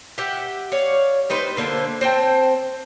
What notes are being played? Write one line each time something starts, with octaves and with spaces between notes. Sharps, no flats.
G4 E5 F#5 G5
C#5 D5 F5
G3 D#4 B4 C5
D3 A#3 C5 A5
C4 C5 G5 A5